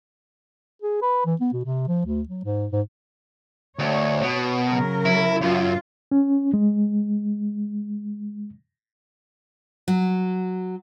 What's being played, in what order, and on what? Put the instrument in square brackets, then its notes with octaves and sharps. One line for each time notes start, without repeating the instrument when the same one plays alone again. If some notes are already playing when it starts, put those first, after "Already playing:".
[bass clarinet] G#4
B4
E3
B3
B2
C3
F3
D2
F#3
G#2
G#2
[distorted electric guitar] D2 [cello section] C#5
[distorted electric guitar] B2
[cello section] C#3 F#3 A#4
[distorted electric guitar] E4
[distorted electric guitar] F#2 [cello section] F4
[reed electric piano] C#4
G#3
[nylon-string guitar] F#3